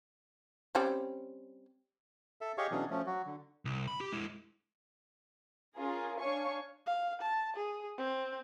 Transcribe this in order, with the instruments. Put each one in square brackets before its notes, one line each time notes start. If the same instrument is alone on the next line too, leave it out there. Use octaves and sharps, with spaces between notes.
[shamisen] G3 C4 C#4
[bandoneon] A4 E5
G4 G#4 C#5 D#5 F5 C#6
B2 E3 F#3 C#4 D4 G#4
F3 A3 C#4
F#3 F#4
D3
[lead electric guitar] C2
B5
G4
G#3 E4
[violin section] C#4 F4 G#4 A#4
D4 C#5 F5 G#5 C#6
[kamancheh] F5
A5
G#4
C4